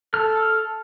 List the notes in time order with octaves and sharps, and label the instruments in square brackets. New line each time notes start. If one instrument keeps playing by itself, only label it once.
[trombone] A4 [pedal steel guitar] F6